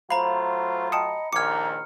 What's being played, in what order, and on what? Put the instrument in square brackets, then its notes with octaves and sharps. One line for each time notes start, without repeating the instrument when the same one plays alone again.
[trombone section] F#3 A3 F4 [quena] C5 [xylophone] F5 [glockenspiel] A#5 B5
[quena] D#5 [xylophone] G5 A5 D#6 [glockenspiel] C#7
[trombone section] A#1 D#2 D#3 [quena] A#5 [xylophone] D6 G#6 [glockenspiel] F6 C#7